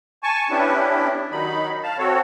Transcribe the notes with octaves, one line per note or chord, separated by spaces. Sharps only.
G#5 A5 C#6
B3 C#4 D4 E4 G4
D#3 F#3 D#4 B5
F5 A5
C4 F#4 A4 C#5